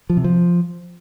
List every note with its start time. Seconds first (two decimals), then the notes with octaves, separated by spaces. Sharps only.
0.10 F3
0.17 C3
0.24 F3